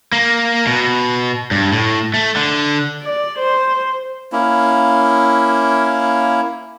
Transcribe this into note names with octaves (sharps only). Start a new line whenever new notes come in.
A#3
B2
G2
A2
A3
D3
D5
C5
A#3 C#4 E4